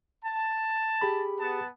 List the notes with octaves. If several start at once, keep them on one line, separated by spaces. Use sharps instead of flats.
A5
G4 G#4 B5
B3 A5